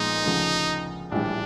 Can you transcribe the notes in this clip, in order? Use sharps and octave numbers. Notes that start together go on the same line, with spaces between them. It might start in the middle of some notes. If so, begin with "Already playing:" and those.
Already playing: A#2 F3 G#3 B3 D#4
D2 C#3 F3
A#1 A2 E3 G3 D4